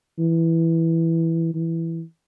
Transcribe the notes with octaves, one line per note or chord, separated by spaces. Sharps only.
E3
E3